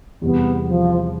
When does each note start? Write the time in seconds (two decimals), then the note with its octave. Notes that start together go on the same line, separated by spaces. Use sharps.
0.22 E2 C3 G3 B3
0.66 F3